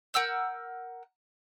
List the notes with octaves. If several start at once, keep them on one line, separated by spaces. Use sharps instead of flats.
A#4 F#5 E6 G6